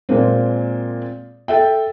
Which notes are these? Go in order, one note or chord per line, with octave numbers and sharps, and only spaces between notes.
A#2 G#3 A#3 C4
A4 E5 G5